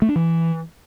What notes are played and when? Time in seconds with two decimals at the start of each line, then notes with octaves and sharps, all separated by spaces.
0.02 A3
0.09 D4
0.16 E3